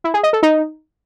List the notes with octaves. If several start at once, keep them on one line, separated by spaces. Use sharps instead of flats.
E4
G#4
D#5
A4
D#4